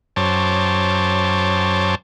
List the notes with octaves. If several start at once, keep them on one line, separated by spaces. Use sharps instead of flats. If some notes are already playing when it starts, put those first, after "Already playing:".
F#2 C5 C#5 A5 D6